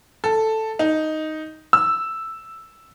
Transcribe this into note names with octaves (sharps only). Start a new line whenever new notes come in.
A4
D#4
E6